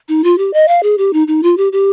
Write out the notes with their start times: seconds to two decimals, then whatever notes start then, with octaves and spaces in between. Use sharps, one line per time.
0.09 D#4
0.24 F4
0.38 G4
0.53 D#5
0.68 F5
0.83 G#4
0.98 G4
1.13 D#4
1.28 D#4
1.43 F4
1.57 G4
1.72 G4